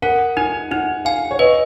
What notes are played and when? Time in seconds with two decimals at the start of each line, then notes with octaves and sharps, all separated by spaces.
0.02 A#4 F#5
0.37 D#4 G#5
0.71 D#4 F#5
1.05 F5 G#5
1.31 C#5
1.39 B4 D#5